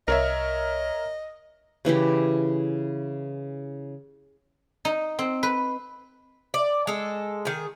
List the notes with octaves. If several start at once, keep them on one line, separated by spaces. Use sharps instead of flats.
C2 A#4 C#5 D#5 E5
C#3 E3 E4 G4
D#4
C4
B4
D5
G#3 A4
D#3 G#4